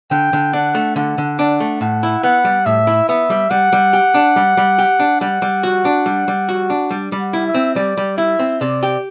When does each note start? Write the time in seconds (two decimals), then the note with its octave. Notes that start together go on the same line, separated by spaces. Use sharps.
0.11 D3 G5
0.33 D3
0.53 D4 F#5
0.75 A3
0.96 D3 F#5
1.18 D3
1.39 D4 F#5
1.60 A3
1.81 A2 F#5
2.03 E4
2.23 B3 F#5
2.45 G3
2.66 A2 E5
2.87 E4
3.09 B3 E5
3.30 G3
3.51 G3 F#5
3.73 G3
3.93 G4
4.14 D4
4.36 G3
4.57 G3
4.78 G4
5.00 D4
5.21 G3 F#5
5.42 G3
5.63 F#4
5.85 D4
6.06 G3
6.28 G3
6.49 F#4
6.70 D4
6.91 G3
7.12 G3
7.19 F#5
7.33 E4
7.48 E5
7.54 C4
7.75 G3 D5
7.97 G3
8.18 E4 E5
8.39 C4
8.61 C3 D5
8.83 G4